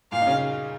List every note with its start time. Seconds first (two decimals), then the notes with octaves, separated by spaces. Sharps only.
0.12 A#2 A#3 F5
0.21 D#4
0.27 C#3 C#4